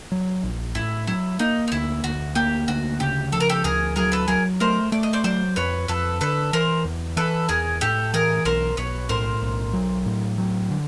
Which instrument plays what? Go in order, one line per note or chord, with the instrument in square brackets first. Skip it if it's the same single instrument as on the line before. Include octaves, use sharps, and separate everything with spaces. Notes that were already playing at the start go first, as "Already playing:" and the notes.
[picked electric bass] F#3
A#1
[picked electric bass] A2 [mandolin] E4
[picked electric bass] F#3 [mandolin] E4
[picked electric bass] A#3 [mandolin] D#4
[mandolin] D#4
[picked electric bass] D2 [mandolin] E4
[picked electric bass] D2 [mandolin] F#4
[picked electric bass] A#3 [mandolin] G4
[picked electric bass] D2 [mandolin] F#4
[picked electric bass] C#3 [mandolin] G4
[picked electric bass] F3 [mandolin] A4
[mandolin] A#4
G4 A4
[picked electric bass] D2 [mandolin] G#4 A#4
[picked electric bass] F#3 [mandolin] G#4 A#4
[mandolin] A4 B4
[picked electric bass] F#3 [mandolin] G#4 A#4
[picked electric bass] A3 [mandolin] A#4 C5
[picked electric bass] A3 [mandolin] D5
[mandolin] D#5
C5 D5
[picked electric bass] F#3 [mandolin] C5 D5
[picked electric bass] F2 [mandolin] B4 C#5
[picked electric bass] F2 [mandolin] A4 B4
[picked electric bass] D3 [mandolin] A4 B4
[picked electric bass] E3 [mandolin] A#4 C5
[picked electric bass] E2
[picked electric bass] E3 [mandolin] A4 B4
[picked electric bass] E2 [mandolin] G#4 A#4
[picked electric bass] A2 [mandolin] G4 A4
[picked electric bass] E3 [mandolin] G#4 A#4
[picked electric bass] B1 [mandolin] A#4 C5
[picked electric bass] B1 [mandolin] B4 C#5
[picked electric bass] A2 [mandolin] A#4 C5
[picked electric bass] B1
F#3
A2
F#3
D3